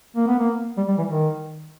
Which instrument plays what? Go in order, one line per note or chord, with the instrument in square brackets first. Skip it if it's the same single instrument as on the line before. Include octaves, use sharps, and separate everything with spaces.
[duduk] A#3
B3
A#3
G3
G3
E3
D#3